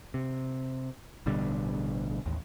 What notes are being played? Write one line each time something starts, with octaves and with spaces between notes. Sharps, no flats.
C3
A1 B2 D3 G3
A1 D#2